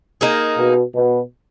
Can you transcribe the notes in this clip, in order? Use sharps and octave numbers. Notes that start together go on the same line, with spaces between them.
A#3 D#4 G#4
B2
B2